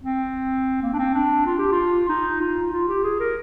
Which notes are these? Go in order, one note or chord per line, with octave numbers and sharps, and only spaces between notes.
C4
A#3
D4
C4
D4
F4
G4
F4
D#4
F4
F4
G4
G#4
A#4